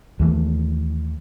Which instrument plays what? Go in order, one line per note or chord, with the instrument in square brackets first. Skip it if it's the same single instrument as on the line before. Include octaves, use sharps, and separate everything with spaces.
[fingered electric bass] D#2 E3 A3